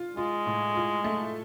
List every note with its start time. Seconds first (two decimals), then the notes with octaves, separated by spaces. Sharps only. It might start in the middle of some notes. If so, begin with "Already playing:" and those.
Already playing: F4
0.17 G#3 F4
0.46 A2
0.76 F4
1.04 A3